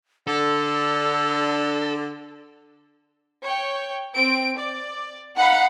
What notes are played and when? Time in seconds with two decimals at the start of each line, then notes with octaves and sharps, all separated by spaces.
0.27 D3 A4 E6
3.42 C#5 G5
4.14 C4 D7
4.57 D5
5.36 D#4 F5 F#5 B5